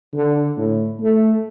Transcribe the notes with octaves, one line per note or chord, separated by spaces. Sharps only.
D3
A2
A3